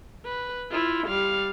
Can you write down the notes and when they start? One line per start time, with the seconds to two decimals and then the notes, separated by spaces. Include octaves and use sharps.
0.25 B4
0.71 E4 F4
1.07 G3 F5